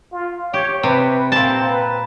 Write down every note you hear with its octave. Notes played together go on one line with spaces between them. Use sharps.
F4
G4 C#5
C3 B4
A#2 C4 A5
B4